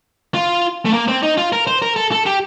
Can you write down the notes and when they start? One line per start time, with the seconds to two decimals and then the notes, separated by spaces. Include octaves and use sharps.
0.34 F4
0.85 A3
0.94 A#3
1.08 C4
1.23 D#4
1.38 F4
1.53 A#4
1.67 C5
1.82 A#4
1.96 A4
2.12 A4
2.26 G4